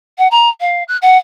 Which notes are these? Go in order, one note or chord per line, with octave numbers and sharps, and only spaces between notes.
F#5
A#5
F5
F#6
F#5